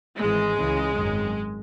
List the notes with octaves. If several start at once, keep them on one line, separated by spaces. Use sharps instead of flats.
G#1 G#2 E3 G#3
C#2 C#3 E3
G#1 F#2 D#3